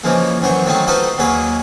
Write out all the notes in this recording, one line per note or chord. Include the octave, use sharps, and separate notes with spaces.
C#3 E3 F3 G#3 A#3
F#2 E3 F#3 C5 C#6
D#3 F#3 A3 C4 D#4
D#4 F4 F#4 A4 B4 C5
D#2 F#3 A#3 G#4 B4 C#5